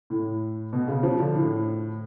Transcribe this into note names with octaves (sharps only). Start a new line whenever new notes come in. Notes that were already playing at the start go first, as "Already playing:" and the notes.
A2
B2
C#3
F3
D3
A2